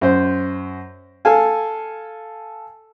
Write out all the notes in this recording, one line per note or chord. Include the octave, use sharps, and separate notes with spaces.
F#2 C5
A4 F5 G#5